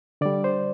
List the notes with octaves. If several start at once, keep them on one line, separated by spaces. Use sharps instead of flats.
D3 G3 D5
C5